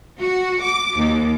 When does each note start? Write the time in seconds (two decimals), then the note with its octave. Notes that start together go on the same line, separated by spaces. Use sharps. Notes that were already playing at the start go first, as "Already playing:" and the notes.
0.21 F#4
0.63 D6
0.98 D#2